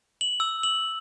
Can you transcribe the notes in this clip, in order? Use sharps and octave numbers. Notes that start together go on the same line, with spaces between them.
F#7
E6
F#7